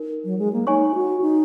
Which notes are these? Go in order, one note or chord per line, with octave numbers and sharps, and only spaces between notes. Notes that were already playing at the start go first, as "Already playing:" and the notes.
Already playing: D#4 A#4
F#3
G#3
A#3
D#4 C#5 G#5 C#6
F#4
D#4